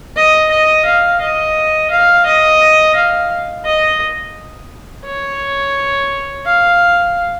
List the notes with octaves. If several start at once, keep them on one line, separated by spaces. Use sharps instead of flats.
D#5
D#5
F5
D#5
F5
D#5
F5
D#5
C#5
F5